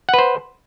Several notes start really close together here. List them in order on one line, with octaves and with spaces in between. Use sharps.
F#5 B4 C5